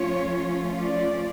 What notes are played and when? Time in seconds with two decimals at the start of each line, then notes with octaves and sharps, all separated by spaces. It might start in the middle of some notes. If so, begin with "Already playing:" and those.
Already playing: F3 A3 C#4 F4 C#5
0.81 D5